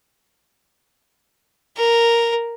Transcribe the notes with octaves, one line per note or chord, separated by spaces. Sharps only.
A#4